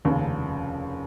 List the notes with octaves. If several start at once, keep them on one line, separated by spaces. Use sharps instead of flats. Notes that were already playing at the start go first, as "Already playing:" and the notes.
F1 D#2 C#3